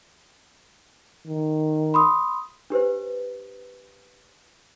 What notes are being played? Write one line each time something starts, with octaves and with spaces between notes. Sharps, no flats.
D#3
B5 C6 D#6
D4 G4 B4 C5